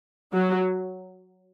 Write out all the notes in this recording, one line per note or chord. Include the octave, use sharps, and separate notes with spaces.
F#3